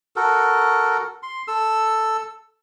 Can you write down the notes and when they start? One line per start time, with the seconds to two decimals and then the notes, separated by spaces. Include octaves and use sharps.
0.16 F#4 A4 A#4
1.23 C6
1.48 A4 E6